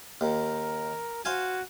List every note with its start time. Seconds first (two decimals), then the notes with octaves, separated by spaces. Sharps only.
0.21 D#2 A#4
1.25 F#4 C5 F5 G#5